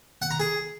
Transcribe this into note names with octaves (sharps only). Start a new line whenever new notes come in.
F#5
A#5
G#4